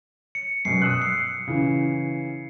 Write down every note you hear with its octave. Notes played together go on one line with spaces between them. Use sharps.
C#7
F#2 B2 C7
D#6 E6 F#6
C7
C#3 E3